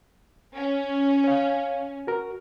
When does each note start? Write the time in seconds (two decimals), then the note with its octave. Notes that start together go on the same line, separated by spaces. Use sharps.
0.55 C#4
1.24 C#5 F5
2.07 F#4 A#4